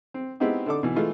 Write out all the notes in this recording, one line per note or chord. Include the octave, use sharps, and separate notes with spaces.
C4
G#3 B3 C4 D#4 E4 G4
D3 D#4 A4 D5 D6
B2 E3
E3 G#3 A3 F4